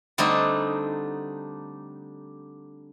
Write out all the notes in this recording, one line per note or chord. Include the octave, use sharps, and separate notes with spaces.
D3 G3 A3 C4 D4 D#4